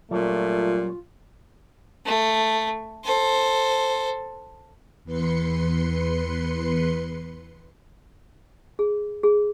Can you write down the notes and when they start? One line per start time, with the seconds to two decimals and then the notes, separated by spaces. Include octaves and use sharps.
0.11 A#2 F#3 G3 A3 C#4 F4
2.06 A3
3.05 A4 C5
5.04 E2 B4 C6 C#7
8.79 G#4
9.24 G#4